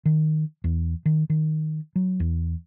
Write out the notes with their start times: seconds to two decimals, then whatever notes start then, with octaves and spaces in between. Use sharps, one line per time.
0.05 D#3
0.64 E2
1.05 D#3
1.30 D#3
1.96 F#3
2.20 E2